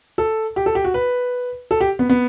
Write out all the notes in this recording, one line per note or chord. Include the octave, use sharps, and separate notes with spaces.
A4
G4
A4
G4
F#4
B4
A4
G4
B3
B3